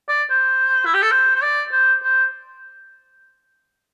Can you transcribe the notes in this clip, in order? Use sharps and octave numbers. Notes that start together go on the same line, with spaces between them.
D5
C5
E4
G4
A4
C5
C5
D5
C5
C5